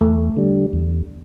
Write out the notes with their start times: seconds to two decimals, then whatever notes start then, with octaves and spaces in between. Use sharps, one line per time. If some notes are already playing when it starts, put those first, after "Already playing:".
0.01 E2 A3
0.37 D3 G3
0.73 E2